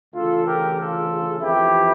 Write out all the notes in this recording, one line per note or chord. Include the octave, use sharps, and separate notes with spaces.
D2 C#3 E3 F4 A4
G4 A#4
F4 A4
F2 E3 E4 G4